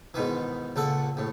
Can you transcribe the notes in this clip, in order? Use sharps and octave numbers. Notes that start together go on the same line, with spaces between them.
G#2 B2 D#3 E3
C#2 A#2 A4 F#5
A#1 A2